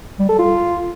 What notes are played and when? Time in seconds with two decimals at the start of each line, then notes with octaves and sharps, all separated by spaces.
0.19 G3
0.29 A4
0.39 F4